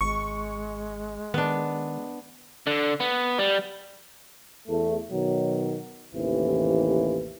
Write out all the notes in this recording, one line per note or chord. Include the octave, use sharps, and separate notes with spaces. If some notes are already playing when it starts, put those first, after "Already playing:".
G#1 G#3 C#6
D#3 B3 D4
D3
B3
G3
E2 A3
B2 D#3 F#3
A1 D#2 C3 E3